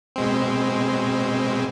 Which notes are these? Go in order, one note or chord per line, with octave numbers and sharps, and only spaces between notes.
B2 G#3 C4